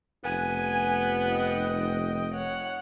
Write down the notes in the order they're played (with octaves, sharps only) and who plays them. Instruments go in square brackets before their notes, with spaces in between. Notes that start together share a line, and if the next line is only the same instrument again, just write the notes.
[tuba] F1 [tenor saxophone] B3 [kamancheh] G#5
[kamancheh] D#5 G5
C#5 F#5